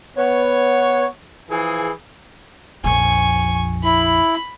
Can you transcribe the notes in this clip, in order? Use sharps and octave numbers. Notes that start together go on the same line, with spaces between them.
B3 C#5
E3 F3 G#4
A#1 F2 G#5 C#6
E4 B5